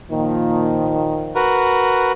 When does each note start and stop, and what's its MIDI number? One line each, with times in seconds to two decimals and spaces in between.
0.11 1.53 46
0.11 1.53 51
0.11 1.53 53
1.35 2.12 66
1.35 2.12 70
1.35 2.12 71